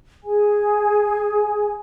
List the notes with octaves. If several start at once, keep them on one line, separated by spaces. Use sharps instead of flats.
G#4 G#5